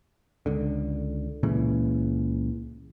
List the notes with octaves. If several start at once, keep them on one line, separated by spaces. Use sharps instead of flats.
C#2 D3
C#2 A#2 C#3 E3